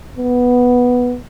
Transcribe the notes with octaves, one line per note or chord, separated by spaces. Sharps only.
B3